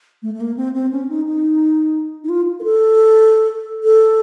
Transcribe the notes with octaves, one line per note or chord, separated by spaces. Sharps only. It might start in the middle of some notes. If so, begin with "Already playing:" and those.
A3
A3
A#3
C4
C4
C#4
D#4
D#4
D#4
F4
A#4
A4
A4